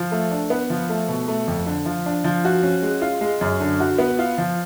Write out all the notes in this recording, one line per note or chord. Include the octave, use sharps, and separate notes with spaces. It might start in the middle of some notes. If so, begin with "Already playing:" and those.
Already playing: F3
A3
D4
B3
F3
A3
B2
A3
F2
D3
F3
D4
F3
F#4
C#4
G#3
F4
G#3
F#2
D3
F#4
B3
F4
F3